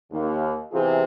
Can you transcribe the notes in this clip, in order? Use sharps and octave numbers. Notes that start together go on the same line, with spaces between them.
D#2
E2 C3 E3 F4 G#4